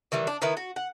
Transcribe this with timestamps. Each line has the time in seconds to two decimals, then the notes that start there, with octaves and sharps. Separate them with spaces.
0.12 D#3 E3 G3
0.27 D4
0.42 D#3 B3 E4
0.57 F#4
0.76 F#5